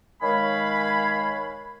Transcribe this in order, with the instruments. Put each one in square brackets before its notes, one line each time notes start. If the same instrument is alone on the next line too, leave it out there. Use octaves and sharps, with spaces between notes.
[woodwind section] D#3 G#3 C#5 F5 G#5 B5